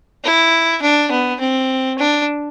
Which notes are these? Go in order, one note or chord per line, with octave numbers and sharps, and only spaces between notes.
E4
D4
B3
C4
D4